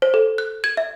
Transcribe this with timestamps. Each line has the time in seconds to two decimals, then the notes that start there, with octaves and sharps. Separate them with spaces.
0.02 C5
0.14 A4
0.38 F#6
0.64 G#6
0.77 E5